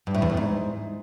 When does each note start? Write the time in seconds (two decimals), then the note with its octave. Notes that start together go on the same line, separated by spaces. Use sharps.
0.07 G2
0.15 A2
0.22 E2
0.30 F#2
0.37 G#2